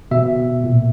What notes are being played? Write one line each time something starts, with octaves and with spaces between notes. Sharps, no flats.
B2 E5
A#2